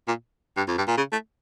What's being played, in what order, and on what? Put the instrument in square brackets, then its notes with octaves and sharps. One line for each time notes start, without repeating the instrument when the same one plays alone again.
[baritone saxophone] A#2
G2
F2
G2
A#2
C#3
A3